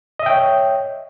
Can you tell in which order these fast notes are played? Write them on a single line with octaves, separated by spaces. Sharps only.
D#5 E5 G5 C#5